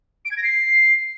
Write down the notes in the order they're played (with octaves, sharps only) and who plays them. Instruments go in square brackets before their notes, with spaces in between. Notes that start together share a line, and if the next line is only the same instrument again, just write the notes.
[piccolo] D7
G#6
A#6
C7